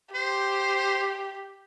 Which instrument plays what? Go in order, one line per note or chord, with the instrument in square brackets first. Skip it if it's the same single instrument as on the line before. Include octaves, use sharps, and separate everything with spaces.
[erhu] G4 [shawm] C5